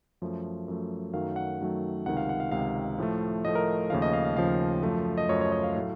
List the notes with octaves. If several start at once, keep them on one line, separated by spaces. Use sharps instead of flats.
F#2 F3 A3
F#2 F3 A3
F#2 D#3 F#3 A3 F5
F#5
F#2 D#3 F#3 A3
C#2 C3 D#3 F#5
F5
F#5
F5
C#2 C3 D#3 F5
A2 F3 A3
A2 F3 A3 D#5
A#4
D#2 C#3 F3 A3 F5
D#5
F5
F5
D#2 C#3 F3 A3 F5
F#2 F3 A3
D#5
F#2 F3 A3 C#5
C#5
D#5
F5
A2 F#3 A3